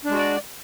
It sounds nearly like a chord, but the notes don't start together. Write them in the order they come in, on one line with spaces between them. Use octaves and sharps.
D4 G#3 F#4 D5